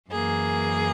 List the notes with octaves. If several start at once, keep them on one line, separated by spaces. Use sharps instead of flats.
F#2 E3 A#3 G#4